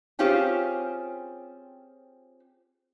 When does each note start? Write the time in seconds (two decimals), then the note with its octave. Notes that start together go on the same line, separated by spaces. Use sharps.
0.19 C4 C#4 F4 G4 G#4